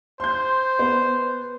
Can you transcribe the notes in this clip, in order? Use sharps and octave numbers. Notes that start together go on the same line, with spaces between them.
C5 C6 G6
B3